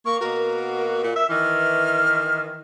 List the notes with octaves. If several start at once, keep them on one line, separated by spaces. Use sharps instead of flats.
A#3 C#6
B2 A#3 F#4 A#4
A#2
E5
D#3 E3 F6